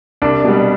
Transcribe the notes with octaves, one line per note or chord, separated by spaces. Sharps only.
C2 D4
B2 G3